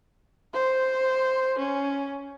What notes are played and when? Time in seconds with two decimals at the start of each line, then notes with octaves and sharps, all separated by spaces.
0.54 C5
1.59 C#4